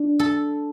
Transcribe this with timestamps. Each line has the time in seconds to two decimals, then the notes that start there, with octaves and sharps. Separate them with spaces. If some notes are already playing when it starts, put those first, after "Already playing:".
Already playing: D4
0.19 A4